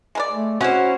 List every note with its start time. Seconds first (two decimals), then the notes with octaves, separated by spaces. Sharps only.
0.15 G#3 A#4 D5
0.31 A3
0.61 G#3 C#4 E4 F#4 C5 F#5